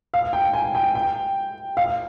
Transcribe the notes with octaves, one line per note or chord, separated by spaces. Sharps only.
F5
G5
G#5
G5
G5
F5